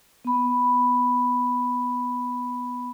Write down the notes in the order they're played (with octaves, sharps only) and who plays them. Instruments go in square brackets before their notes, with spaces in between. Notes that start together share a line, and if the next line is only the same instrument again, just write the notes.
[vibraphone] B3 B5